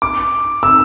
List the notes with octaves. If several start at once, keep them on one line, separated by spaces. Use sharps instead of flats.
D6
E6